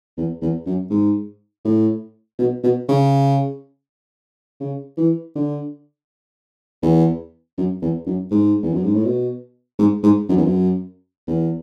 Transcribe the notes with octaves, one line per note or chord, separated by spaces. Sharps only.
E2
E2
F#2
G#2
A2
B2
B2
C#3
C#3
E3
D3
E2
F#2
E2
F#2
G#2
E2
F#2
G#2
A2
B2
G#2
G#2
F#2
E2
F#2
E2